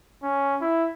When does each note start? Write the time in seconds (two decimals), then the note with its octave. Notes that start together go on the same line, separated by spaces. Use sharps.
0.23 C#4
0.61 E4